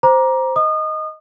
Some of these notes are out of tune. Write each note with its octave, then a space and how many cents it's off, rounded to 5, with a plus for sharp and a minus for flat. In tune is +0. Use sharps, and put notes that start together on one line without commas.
C5 +0 A#5 +20 D6 +0
D#5 +5 D#6 -30